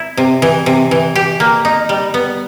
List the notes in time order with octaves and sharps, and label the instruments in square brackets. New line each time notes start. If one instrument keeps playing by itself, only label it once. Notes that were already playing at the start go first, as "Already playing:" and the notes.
Already playing: [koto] E4
C3
E3
C3
E3
G4
A#3
D#4
G3
B3